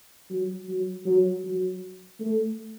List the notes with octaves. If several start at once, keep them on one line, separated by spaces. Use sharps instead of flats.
F#3
F#3
F#3
F#3
A3